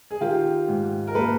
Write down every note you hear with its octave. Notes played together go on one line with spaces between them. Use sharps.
G#4
D#3 F4 G4
G#2
A#4
A#3 A4 B4